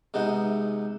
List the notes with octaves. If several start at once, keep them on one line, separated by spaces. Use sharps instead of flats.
G#2 C3 B3 D#4